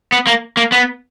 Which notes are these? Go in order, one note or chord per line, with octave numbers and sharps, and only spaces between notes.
B3
A#3
A#3
B3